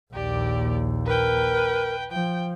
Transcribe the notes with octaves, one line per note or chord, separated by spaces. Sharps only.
A#1 D#2 G4 D5
A#4 B4 G5
F3 G5